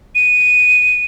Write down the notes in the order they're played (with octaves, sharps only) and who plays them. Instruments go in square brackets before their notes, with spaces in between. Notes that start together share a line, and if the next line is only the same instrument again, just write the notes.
[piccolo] D#7